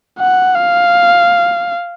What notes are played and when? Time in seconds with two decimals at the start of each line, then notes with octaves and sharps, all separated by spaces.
0.19 F#5
0.56 F5